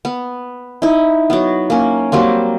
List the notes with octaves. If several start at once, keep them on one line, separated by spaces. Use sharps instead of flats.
B3
D#4 E4
F#3 B3
A#3 C#4
F#3 G3 A#3 C4